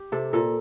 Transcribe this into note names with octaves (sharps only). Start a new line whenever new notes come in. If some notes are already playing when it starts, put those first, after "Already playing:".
Already playing: G4
C3 A4
A#2 A4